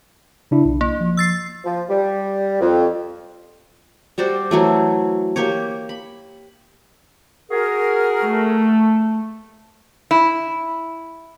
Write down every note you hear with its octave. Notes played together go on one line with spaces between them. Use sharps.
C#3 D4 E4
B1
A#3
F3
E6 A6 C7
F3
G3
F2
G3 F#4 C5 D5
E3 F#3 A3
A#3 G4 C#5
B5
F#4 G#4 A#4
A3
E4